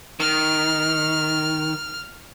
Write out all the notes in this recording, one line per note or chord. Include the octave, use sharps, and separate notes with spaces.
D#3 F6